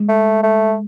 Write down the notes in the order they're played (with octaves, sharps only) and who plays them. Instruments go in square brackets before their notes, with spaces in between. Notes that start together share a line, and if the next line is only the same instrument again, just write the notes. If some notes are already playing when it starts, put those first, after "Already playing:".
Already playing: [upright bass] G#3
[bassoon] A3
A3